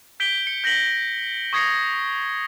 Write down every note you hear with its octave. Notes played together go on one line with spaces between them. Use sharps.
G6 B6 D7 G7
C#7
G6 A#6 B6 F#7 G7
C#6 D#6 G#6 A#6 C7 C#7